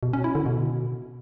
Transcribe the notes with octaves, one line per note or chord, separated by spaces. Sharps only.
B2
C#4
E4
D3
B2